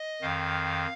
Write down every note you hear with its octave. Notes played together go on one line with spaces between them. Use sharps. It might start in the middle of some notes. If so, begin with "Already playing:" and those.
Already playing: D#5
F2 D#3 F5